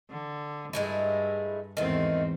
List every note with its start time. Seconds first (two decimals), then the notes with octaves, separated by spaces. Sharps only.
0.10 D3
0.73 G2 G#3 A3 E4
1.77 E2 G#2 D#3 A3 C4